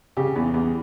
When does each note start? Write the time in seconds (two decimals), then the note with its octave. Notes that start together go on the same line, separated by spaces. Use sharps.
0.17 C#3 G4
0.36 E2
0.54 E2